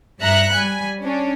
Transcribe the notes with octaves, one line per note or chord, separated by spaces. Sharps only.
G2 E5 A#5 F#6 C#7
G3 G#5 B5
C#4 D4